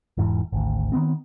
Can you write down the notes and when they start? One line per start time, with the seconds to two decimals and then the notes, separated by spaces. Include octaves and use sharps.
0.17 E1 G#2 E3
0.52 G#1 D2
0.92 D#3 E3 B3 C4